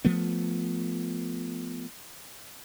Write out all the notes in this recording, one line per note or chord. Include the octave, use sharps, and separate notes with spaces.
F3 A3 B3